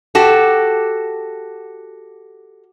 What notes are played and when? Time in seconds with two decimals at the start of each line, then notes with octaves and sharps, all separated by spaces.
0.15 F#4 G4 A4